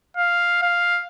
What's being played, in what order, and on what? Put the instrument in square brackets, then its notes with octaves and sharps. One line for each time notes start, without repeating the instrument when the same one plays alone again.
[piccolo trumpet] F5
F5